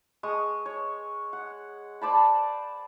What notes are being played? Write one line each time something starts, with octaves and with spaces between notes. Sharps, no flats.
G#3 C#6 D#6
C#5
F#5
C5 D5 A5 B5